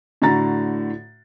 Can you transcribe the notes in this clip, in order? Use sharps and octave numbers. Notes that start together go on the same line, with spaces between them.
A2 D3 F#4 A#5 A6